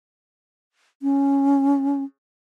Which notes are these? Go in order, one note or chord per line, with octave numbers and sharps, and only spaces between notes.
C#4